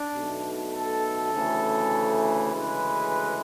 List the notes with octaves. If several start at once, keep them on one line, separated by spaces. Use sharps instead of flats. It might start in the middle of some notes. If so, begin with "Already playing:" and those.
Already playing: D4
B1 B2 A3
A4
D2 C#3 E3 A3
D2 C#3 E3 G#3 B4